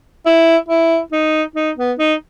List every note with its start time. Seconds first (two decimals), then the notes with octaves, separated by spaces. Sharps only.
0.26 E4
0.69 E4
1.12 D#4
1.56 D#4
1.77 B3
1.99 D#4